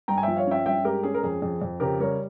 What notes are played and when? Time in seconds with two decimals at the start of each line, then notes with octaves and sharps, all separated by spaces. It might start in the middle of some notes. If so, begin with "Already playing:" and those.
0.08 G2 G5 A#5
0.18 G#5
0.23 F3 E5 G5
0.36 C#5 F5
0.47 C#4 E5 G5
0.66 G2 E5 G5
0.84 G#3 G4 A#4
1.03 C#4 G#4
1.14 A#4
1.23 F2 G#4
1.42 F2 G#4
1.62 F2
1.80 C#3 G4 A#4
2.00 G3 A#4 C#5